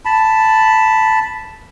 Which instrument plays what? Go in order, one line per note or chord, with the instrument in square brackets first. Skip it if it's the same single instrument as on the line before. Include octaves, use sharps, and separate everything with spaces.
[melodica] A5 B5